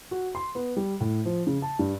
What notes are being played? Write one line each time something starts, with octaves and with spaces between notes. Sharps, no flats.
F#4
C6
B3
G3
A2
F3
C#3
A5
G2